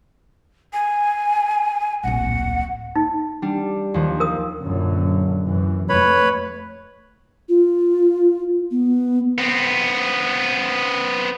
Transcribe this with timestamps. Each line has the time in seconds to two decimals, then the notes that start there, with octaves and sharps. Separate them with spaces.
0.73 G#5
2.03 D1 A#1 F#5
2.96 D#4
3.42 G3 D4
3.94 D#2 F3
4.20 A#4 D#6
4.62 A#1 F#2 D3
5.46 F#2 E3
5.89 F2 A3 B4 C#5 B5
7.49 F4
8.71 B3
9.38 B3 C4